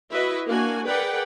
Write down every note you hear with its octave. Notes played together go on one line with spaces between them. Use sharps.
E4 F#4 B4 D#5 E5
A#3 D4 F#4 G#5
G#4 A#4 B4 D5 F#5 G5